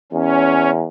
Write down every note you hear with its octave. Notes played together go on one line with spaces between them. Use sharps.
E2 C#4